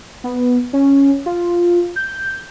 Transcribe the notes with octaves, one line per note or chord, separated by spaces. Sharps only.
B3
C#4
F4
G6